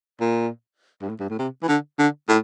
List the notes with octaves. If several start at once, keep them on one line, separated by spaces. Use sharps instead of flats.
A#2
G2
A2
G2
A2
C3
E3
D3
D3
A2